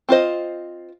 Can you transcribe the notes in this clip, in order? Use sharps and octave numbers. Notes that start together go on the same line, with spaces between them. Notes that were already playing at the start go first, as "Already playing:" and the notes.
C4 F4 C5 D#5